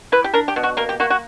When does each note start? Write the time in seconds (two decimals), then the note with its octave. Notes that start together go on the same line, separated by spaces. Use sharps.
0.12 E4 B4
0.24 G4
0.34 D4 A#4
0.48 G4
0.56 B2
0.63 F#4
0.77 A#3 A#4
0.89 G4
1.00 A#3 F#4
1.10 F#4